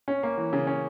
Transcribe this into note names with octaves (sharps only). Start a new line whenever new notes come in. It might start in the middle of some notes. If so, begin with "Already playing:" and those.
C#4
A#3
E3
C#3
C#4